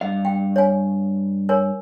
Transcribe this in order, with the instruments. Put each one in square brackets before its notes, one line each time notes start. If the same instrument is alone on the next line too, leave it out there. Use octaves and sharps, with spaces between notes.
[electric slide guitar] G2 F5 [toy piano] D#5
[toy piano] G5
C#5 G#5
A#4 C#5 G#5